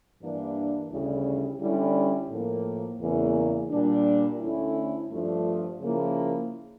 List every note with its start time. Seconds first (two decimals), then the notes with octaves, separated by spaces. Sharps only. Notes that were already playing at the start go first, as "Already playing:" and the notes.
0.22 G2 E3 A#3 D4
0.91 D2 C#3 G3 C#4 E4
1.60 D3 G3 C#4 E4
2.30 A2 F3 A#3
3.01 E2 C#3 E3 A#3
3.70 A#2 G3 D4
4.40 D2 D3 A3 C#4 E4
5.11 G2 F3 A3 D4 F4
5.80 C#3 F3 A#3 E4